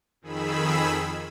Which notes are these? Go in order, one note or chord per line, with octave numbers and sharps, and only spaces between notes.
F2 D#3 G#4 B5 E6